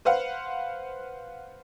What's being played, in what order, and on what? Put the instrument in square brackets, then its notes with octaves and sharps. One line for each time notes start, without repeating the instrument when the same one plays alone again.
[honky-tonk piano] B4 C5 F5 F#5